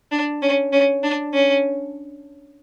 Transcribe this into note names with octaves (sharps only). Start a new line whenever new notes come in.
D4
C#4
C#4
D4
C#4